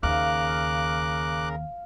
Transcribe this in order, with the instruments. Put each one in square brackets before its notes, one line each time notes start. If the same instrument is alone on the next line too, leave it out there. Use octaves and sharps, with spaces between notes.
[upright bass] D#2 [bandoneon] C#3 A#4 [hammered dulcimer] F5 [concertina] D6 F#6